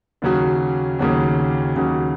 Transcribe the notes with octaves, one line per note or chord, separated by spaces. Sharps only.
D#2 C#3 F#3 C#4 F#4
D#2 C#3 F#3 C#4 F#4
D#2 C#3 F#3 C#4 F#4